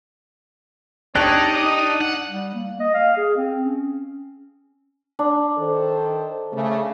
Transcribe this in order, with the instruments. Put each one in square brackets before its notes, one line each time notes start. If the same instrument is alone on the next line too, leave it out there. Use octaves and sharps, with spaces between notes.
[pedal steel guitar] D4 G4 [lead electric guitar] D#4 [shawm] C#5 [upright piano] A5 F#6
[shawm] D#6
[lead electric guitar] F#5
[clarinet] G3
A#3
D#5
F5
G#4
C4
C#4
[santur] D4
[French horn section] D#3 A4 C5
C#3 A3